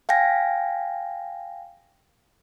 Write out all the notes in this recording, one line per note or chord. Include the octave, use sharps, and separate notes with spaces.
F5 G5 G#5 A#6